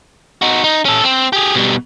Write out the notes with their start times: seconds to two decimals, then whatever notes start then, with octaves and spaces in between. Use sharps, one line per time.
0.42 D#4 F#4
0.64 D#4
0.85 C#4 A4
1.03 C4
1.33 G4 G#4
1.55 B2 G3